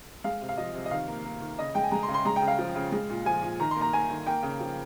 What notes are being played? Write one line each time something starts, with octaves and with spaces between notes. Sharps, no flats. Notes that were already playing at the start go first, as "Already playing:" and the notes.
G#3 F5
C3
F5
F3 D#5
C3
D#5
D#3 F5
A#3
A#3
D#3
C#3 D#5
G#3 G5
G#5
G#3 A#5
C6
C#3
C6
G#3 A#5
G5
C#3
F5
F3
C#3
G#3
A#2
F3 G#5
A#2
D#3 A#5
C6
A#3 A#5
A#3 G#5
D#3
A#3 G5
C#3
F3